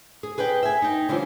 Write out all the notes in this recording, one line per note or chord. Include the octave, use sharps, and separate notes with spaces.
G#4
G#4 B4 D#5 G5
E5 G#5
D#4 G5
D3 E3 F3 G3 C4 C#4